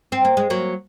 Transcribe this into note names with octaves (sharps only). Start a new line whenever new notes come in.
C4
A#3
G#3
F#3 A#3